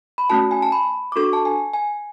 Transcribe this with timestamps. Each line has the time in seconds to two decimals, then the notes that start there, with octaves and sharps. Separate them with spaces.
0.18 B5
0.30 A3 C#4 F#4 A5
0.51 G#5
0.62 A5
0.72 B5
1.12 D6
1.16 D4 F#4 A4 C#6
1.33 A5
1.45 G#5
1.74 G#5